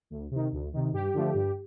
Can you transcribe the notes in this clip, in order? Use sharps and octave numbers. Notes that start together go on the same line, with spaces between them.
D2
C3 D#3
D2
C3 D#3
G2 G4
D3 F3 A3
G2